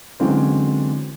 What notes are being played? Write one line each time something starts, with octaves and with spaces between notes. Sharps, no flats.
D3 E3 F#3 G#3 C4 C#4